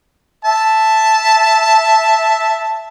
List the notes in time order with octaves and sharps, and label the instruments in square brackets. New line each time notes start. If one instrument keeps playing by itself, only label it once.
[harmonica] E5 A5